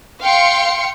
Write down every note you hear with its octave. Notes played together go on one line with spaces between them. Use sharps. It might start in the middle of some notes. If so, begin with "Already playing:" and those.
F5 G5 C6 C#7